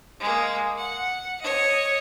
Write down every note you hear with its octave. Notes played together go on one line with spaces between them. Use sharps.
G#3 A#3
F#5
C#5 D#5